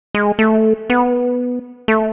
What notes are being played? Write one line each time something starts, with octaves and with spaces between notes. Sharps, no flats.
G#3
A3
B3
A3